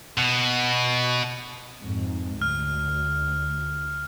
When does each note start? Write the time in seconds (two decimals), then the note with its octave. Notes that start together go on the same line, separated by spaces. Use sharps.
0.18 B2
1.81 F2 G#2
2.42 D2 F6